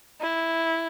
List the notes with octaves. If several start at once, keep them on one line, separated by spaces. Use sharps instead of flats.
E4